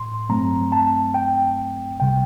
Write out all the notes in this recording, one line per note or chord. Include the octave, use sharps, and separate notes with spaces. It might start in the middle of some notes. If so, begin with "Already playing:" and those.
Already playing: A2 C6
G2 F#3 A3 C4 A#5
A5
G5
C2 C3 G3 G5